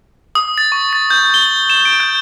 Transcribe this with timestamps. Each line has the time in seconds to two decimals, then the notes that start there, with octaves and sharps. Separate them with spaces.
0.35 D#6
0.58 A6
0.72 C#6
0.93 A6
1.10 G6
1.34 G7
1.70 E7
1.85 D7
2.00 G6